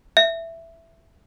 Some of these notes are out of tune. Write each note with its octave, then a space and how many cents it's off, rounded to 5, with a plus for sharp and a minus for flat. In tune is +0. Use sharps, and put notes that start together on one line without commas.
E5 +5